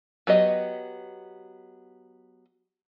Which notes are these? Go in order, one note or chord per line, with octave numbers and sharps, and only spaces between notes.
F#3 B3 G4 D#5